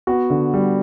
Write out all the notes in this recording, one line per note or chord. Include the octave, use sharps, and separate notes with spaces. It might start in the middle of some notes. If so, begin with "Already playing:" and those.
B3 F#4
D3
G3